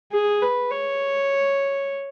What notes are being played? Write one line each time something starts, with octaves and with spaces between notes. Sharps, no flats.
G#4
B4
C#5